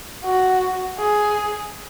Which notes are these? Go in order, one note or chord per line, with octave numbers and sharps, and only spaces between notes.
F#4
G#4